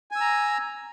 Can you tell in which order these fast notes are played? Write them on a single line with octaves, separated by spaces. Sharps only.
G#5 E6 A#5